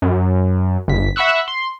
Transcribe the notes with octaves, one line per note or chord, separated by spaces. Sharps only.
F#2
G1 B6
E5 F#5 B5 C#6 E6 F#6
C6